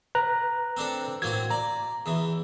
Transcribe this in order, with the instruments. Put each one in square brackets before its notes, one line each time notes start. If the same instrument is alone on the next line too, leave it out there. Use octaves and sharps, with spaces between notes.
[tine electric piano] B4 A#5 F#6
[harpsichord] C4 D4 A4
[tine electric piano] A2 G#6 [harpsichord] F#3 A#3 C4
[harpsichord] D5 [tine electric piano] A#5
[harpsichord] E2 E3